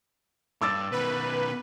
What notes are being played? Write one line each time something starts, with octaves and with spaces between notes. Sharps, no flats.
G2 D6 E6 A6
B2 D#3 B4